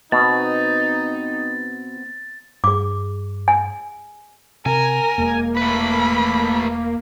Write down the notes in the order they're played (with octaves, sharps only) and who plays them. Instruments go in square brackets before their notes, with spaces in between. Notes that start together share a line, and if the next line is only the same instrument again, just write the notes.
[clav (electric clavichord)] B2 [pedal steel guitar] B3 C4 [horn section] D#4 [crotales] A6
[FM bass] G2 [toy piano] G#4 D6
[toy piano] G#5
[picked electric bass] C3 [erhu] A#4 [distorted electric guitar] G#5
[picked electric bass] E1 G#3 [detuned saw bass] A#3
[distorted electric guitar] A3 B4 [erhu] B5